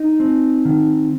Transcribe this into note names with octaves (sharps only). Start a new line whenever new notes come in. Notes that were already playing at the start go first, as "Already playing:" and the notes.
Already playing: D#4
C4
D#3